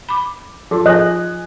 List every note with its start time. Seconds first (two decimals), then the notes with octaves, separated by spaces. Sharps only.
0.09 B5 D6
0.71 F3 F4 A4 C6
0.86 F4 B4 D#5 G#5 F#6